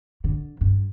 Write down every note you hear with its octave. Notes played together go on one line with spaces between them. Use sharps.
D3
G2